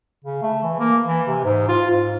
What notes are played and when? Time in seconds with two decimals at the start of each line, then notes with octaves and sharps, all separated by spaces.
0.25 C#3
0.42 A3
0.63 E3
0.79 A#3
1.06 E3
1.27 C3
1.44 G#2
1.68 F4
1.91 G#2